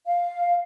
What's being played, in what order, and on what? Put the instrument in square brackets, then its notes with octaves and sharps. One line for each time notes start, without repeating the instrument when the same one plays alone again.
[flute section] F5